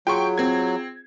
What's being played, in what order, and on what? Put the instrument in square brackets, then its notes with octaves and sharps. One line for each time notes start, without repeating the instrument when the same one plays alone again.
[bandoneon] F#3 [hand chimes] F4 G#4 [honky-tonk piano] G5 C6 C#6
[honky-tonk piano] C4 G#6